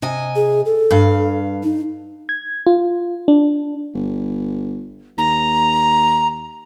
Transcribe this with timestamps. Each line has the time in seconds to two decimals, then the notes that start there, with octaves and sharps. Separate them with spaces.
0.02 C3 D#5 G#5
0.36 G#4
0.66 A4
0.91 G2 F5
1.63 D#4
2.29 G#6
2.67 F4
3.28 D4
3.95 G1
5.18 D#2 A#5